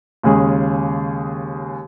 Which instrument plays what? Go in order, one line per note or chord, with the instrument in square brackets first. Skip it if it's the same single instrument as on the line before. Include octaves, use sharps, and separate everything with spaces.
[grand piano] D#2 C#3 G#3 C#4 G#4